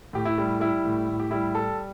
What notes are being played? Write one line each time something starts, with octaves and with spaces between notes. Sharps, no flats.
A2 G4
E4
G3
G3 E4
A2
A2
G4
G3 E4
G3 A4